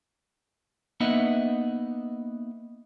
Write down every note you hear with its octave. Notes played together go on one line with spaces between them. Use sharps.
A#3 B3 D#4 D#5 E5 F#5